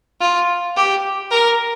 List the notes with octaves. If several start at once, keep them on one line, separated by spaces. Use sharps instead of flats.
F4
G4
A#4